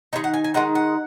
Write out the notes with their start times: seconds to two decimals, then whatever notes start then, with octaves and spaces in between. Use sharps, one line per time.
0.13 D#3 G#3 D#4 C#5
0.24 F#5
0.34 G#5
0.44 G#5
0.54 D#3 G#3 D#4 F#5
0.75 F#5